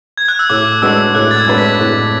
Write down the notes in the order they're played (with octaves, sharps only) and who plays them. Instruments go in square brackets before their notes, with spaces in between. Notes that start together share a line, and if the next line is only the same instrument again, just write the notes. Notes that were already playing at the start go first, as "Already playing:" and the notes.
[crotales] G#6
F#6
E6
[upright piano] A2 [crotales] D6
[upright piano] G#3 D4 F#4 B4 [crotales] E6
[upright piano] A2 [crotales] F#6
[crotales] A6
G#6
[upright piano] G#3 D4 F#4 B4
[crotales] B6
[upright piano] A2